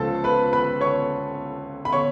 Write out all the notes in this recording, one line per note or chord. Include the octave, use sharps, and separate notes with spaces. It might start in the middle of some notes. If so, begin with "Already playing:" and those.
Already playing: C#2 C#3 F3 A4 A5
B4 B5
B4 B5
C#5 C#6
B5
C#5 C#6